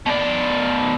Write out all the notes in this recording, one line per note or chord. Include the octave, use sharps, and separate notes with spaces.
B2 D5